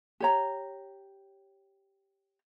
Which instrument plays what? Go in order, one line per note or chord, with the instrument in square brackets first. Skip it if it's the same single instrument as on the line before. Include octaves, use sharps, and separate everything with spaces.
[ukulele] G4 C#5 A#5